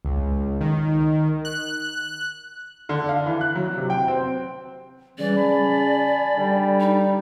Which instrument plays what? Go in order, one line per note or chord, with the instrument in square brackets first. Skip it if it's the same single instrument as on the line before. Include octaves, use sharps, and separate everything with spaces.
[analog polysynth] C#2
D#3
F#6
[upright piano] D3
F5
E3
F#6
F#3
C3
G5
C4
[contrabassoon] C#3 [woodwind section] E3 G3 [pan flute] D5
[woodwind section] G#5 A5 B5
[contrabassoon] D3 [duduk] G3
[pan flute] D#4